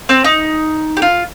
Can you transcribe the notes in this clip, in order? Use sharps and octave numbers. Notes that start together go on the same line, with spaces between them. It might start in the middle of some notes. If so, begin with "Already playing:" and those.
C4
D#4
G4
F4